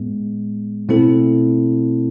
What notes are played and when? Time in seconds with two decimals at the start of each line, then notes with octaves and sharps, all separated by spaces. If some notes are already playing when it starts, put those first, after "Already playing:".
Already playing: A2 G#3 B3
0.89 B2 A3 C4 E4 A4